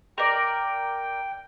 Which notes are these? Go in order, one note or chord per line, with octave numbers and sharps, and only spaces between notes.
A#4 D5 G5